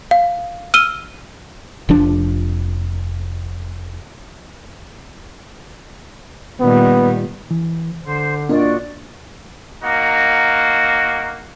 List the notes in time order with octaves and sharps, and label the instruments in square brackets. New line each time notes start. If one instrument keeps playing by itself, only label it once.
[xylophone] F5
E6 F6 D#7 G7
[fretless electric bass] F1 F3 D4
[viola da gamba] A#2 D#3 G3 [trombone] B3
[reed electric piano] E3
[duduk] D3 [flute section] C5
[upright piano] A#2 [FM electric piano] D4 A#4 D#5 [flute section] F#4 D5
[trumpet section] A#3 D#4 F#4